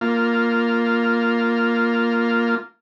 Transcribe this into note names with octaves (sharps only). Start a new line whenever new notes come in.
A#3 F4